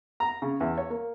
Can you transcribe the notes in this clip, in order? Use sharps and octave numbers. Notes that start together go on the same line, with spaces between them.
A#5
C#3
E2
C#5
A#3